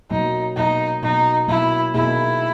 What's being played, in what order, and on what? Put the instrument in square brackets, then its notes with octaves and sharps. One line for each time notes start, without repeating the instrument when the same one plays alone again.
[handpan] B2 F#3 A#3 [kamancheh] D#4
[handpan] B2 F#3 A#3 [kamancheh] D#4
[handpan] B2 F#3 A#3 [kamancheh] D#4
[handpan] B2 F#3 A#3 [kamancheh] E4
[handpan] B2 A#3 D#4 G#4 [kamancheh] E4